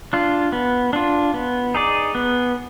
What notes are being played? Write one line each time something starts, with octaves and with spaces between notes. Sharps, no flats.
D4 F4
B3
D4 F4
B3
D#4 G#4 D5
B3